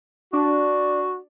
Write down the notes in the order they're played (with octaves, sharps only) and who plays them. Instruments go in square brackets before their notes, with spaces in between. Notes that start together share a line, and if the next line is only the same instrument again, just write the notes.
[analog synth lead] D4 [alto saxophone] F#4